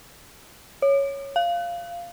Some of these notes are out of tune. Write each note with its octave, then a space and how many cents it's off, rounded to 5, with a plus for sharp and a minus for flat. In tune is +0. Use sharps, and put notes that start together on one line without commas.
C#5 +0
F5 -10